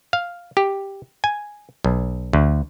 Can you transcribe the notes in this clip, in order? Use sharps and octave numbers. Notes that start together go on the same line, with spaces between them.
F5
G4
G#5
B1
D2